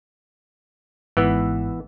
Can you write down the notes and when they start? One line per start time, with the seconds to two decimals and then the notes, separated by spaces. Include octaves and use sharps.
1.17 G#1 G#2 E3 B3 E6